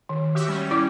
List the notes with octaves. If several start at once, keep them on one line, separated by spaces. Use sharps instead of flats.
D#3
F#4 G4 E5
G3 C#4
E4 D5 D6